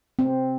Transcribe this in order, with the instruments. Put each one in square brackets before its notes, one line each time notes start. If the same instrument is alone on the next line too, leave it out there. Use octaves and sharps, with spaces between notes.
[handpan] C4